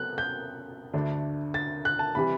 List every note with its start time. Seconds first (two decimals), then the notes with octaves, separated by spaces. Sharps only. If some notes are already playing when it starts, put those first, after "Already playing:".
Already playing: F#3 B3 F#4 A4 F#6
0.18 G6
0.94 D2 D3 A3 D4
1.54 A6
1.85 F#6
1.99 A5
2.15 C3 E3 G3 B5